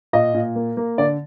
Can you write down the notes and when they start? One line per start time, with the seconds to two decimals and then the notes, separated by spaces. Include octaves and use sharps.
0.13 A#2 D#5
0.34 A#2
0.56 A#3
0.77 A#3
0.98 D3 D5